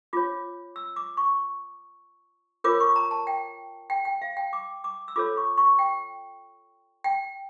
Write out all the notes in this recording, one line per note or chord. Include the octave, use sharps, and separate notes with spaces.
F4 C#5 D6
E6
D6
C#6
F4 A#4 C#5 D6
C#6
A#5
A5
G5
G5
G5
F5
G5
D6
D6
E6
F4 A4 C#5 D6
C#6
C#6
G5
G5